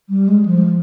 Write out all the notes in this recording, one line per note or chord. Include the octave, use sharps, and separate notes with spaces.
G3
G#3
F3